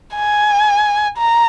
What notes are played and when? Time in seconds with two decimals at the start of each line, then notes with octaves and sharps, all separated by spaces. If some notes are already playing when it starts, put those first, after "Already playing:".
0.16 G#5
1.18 A#5